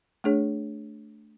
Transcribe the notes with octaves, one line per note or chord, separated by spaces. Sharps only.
A3 D4 G#4 C#5